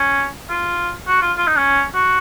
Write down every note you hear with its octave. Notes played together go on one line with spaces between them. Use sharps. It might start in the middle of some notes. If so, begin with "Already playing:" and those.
Already playing: C#4
F4
F#4
F4
F4
D#4
C#4
F#4